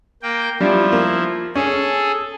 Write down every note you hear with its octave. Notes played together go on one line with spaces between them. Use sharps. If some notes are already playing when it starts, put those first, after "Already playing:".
A#3 G5
F3 G3 D4 E4
A#3
C#4 G#4 A4